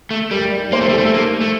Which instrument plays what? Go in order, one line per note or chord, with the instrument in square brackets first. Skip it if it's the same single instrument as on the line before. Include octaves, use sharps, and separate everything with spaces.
[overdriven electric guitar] A3
[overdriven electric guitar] G3 [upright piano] A#4
[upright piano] D5
[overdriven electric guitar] A#3 [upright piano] C5
[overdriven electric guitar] A3
G3
[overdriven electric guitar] A3 [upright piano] A4
[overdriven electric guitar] A3
A#3
A3